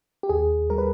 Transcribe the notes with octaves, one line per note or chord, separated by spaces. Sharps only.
G4
D#2 G#4
G3 A#4
B4